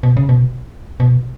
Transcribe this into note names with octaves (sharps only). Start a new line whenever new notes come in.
B2
C#3
B2
B2